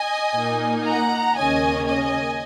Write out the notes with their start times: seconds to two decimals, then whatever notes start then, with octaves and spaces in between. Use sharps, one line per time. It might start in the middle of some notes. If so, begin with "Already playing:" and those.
Already playing: D#5 G#5
0.35 A#2 A#3 D#4
0.85 F#5 A#5
1.37 D#2 C#3 A#3 C#4 D#5 G#5
1.87 D#5 G#5